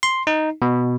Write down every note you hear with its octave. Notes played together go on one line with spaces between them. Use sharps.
C6
D#4
B2